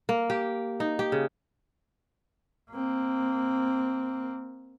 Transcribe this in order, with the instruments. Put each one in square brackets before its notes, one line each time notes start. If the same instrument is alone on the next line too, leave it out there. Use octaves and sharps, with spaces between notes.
[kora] A#3
G4
D#4
G4
C#3
[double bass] A#3 C4